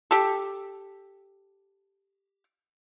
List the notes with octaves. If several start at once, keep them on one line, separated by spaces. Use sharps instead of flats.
G4 A4